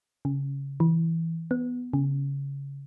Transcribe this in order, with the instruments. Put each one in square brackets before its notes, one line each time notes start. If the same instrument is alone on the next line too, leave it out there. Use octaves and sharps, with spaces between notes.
[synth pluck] C#3
E3
B3
C#3